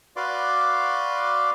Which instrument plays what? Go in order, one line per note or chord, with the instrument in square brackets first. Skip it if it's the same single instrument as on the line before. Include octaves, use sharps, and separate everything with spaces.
[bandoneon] F#4 B4 D5 F5 C6 D6